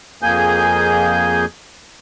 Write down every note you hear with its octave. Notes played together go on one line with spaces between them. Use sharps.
F2 A#3 G#4 G#5 G6